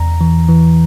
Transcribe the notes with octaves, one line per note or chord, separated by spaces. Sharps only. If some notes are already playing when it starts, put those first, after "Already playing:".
Already playing: E2 A#5
E3
E3